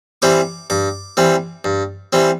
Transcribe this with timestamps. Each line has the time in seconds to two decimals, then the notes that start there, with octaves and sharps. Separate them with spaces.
0.22 E3 G3 C4 D6
0.70 G2 D6
1.17 E3 G3 C4
1.64 G2
2.13 E3 G3 C4